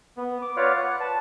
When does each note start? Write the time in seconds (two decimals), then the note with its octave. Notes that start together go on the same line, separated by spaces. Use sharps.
0.17 B3
0.42 D6
0.56 F4 B4 C#5 D5 F5 F#5
0.77 F#5 F#6
1.00 B4 A5